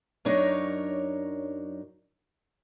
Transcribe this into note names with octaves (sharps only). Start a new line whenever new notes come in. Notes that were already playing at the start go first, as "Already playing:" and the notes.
F#2 F#3 D4 D#4 A#4 C#5